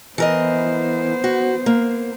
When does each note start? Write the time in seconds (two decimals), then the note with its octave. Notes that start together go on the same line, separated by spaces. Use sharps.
0.18 E3 B3 A#4 C5 D#5
1.24 F#4
1.66 A#3